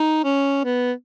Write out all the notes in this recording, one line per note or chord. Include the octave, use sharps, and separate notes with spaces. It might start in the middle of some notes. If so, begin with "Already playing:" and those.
Already playing: D#4
C#4
B3